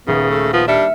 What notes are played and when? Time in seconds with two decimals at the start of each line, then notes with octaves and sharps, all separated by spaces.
0.07 D#1 C#3 B3
0.31 A3
0.53 F3 B3
0.68 G3 D4 E5 F6 C#7